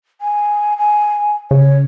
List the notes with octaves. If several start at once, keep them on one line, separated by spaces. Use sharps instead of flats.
G#5
G#5
C#3 C#5